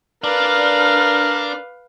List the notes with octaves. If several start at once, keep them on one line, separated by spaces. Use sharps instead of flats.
D4 A#4 B4 D5 F5